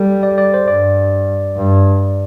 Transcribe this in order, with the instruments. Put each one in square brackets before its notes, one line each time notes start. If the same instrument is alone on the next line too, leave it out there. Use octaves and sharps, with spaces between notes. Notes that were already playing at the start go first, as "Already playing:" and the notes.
Already playing: [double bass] G3 [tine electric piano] A4
[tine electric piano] D5
D5
C5
[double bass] G2 [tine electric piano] D5
[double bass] G2